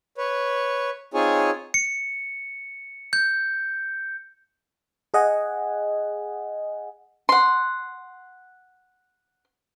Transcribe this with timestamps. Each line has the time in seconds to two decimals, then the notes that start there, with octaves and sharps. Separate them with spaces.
0.18 B4 C#5
1.14 C4 D#4 F4 G#4 C#5 G#5
1.74 C#7
3.13 G6
5.14 G#4 D#5 F#5 G#5
7.29 F#5 C6